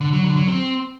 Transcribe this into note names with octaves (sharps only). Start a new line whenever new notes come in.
D3
F#3
D3
F#3
C4